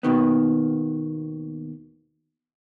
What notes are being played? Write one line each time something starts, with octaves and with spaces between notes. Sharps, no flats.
D#2 B2 D#3 B3